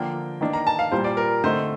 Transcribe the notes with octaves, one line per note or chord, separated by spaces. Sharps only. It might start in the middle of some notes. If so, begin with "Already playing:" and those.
Already playing: D3 F3 A#3 D4 G5
D#3 A#3 D4
A#5
A5
F5
A#2 G3 A#3 C5
D5
A#4
D3 A3 C4 D#4 C5